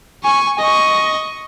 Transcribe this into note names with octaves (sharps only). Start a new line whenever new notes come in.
G#5 C#6
D#5 C#6